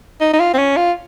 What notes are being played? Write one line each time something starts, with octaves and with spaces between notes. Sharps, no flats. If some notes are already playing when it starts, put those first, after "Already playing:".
D#4
D#4
F4
C4
C#4
F4